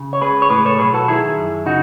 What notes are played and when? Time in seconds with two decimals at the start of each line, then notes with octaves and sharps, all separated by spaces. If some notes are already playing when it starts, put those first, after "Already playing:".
Already playing: C#3
0.13 C#5
0.21 C#2 G#4 B4
0.42 C#5
0.50 A2 G#4 B4
0.66 A4 C#5
0.79 B1 G#4 B4
0.94 F#4 A4
1.08 D#3 E4 G#4
1.38 F#2
1.66 C#3 D#4 F#4